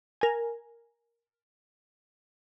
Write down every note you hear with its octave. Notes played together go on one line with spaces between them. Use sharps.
A#4 G#5